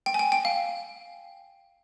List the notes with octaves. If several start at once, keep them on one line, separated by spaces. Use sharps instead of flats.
G5
G#5
G5
G5
F5